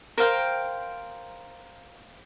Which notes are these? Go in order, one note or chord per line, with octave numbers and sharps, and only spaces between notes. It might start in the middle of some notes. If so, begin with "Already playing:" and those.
A#4 C5 F5 G5